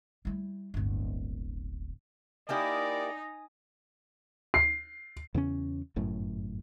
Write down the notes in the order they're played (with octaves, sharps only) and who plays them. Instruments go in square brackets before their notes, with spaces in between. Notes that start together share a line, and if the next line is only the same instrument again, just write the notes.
[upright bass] G3 E4
D1 G1
[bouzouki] A#3 E4 G4 [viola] D#4 [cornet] D5 [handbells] G#5 D#6
[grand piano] C7
[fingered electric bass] E2 C#3 C4 C#4
G1 F#2 A2